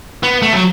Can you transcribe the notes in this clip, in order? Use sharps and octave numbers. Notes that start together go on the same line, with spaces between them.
B3
A3
F#3